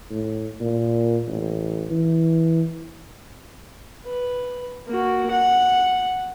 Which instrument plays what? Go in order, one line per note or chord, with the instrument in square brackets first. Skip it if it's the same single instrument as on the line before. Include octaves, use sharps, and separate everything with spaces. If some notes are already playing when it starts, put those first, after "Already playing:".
[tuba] A2
A#2
A1
E3
[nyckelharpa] B4
A#3 F#4
F#5